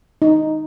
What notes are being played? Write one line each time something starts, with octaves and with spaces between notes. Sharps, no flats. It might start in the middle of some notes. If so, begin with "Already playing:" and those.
D#4